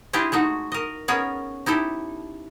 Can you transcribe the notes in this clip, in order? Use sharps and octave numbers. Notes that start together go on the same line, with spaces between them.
D4 E4 F4 G4 G#4 D#5
G#3 A3 D#4 F#4
A#4 D#5
B3 C#4 G#4 A#4
D#4 E4 G4 A4